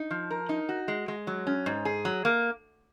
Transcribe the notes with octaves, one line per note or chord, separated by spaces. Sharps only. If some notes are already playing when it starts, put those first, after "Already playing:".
Already playing: D#4
F3
A#4
D#4
F#4
G#3
G#3
F#3
C#4
G#2
G#4
F#3
A#3